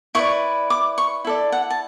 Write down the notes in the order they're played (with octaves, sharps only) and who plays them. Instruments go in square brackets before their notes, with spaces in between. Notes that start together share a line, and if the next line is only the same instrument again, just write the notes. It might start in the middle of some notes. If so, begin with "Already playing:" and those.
[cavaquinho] E4 B4 D5 C#6
D6
C#6
E4 A4 D5
F#5
A5